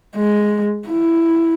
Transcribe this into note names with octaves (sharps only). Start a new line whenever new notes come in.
G#3
E4